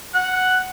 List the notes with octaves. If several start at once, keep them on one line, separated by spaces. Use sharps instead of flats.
F#5